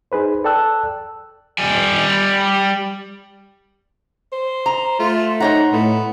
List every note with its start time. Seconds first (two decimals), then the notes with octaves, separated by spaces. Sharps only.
0.12 D#4 G#4 B4 C5
0.44 A4 D5 G5 A5 E6 F#6
1.58 G3 G#5
4.32 C5
4.66 A#5
5.00 A3 F4
5.40 D#4 C5 C#5 F#5 A#5
5.73 A2 A3 B3